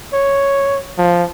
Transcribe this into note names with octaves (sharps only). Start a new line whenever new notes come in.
C#5
F3